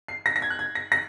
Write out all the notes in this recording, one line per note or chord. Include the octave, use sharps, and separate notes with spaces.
C7
A#6
A#6
G#6
F#6
G#6
A#6
A#6